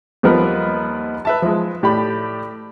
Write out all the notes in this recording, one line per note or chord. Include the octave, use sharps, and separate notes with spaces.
D#2 F3 G3 B3 A#4 B4
B4 E5 A5
F3 G#3
A2 G4 D5 B5